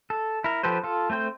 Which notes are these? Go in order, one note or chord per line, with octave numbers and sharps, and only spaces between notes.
A4
E4 A#4
F3 G4 A4 B4 C5
F4 A4
A3 C4 C5 G5